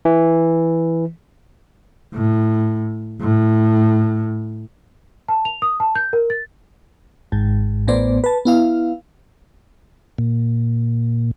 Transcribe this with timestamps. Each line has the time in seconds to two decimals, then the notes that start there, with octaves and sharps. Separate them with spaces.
0.05 E3
2.14 A2
3.21 A2
5.28 A5
5.45 F7
5.62 D#6
5.80 A5
5.95 G6
6.13 A#4
6.30 A6
7.32 G#1 G#2
7.87 A1 A2 B3 C5 D5
8.24 B4 A5
8.45 B3 E4 F5
10.18 A#2